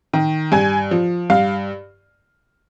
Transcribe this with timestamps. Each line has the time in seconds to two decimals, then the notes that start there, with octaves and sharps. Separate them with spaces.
0.13 D#3
0.52 G2 G#5
0.91 F3
1.30 G2 F5